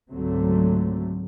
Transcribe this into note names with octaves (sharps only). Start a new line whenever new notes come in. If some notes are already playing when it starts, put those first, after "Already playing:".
C#2 G#2 D3 F#3 A3 C4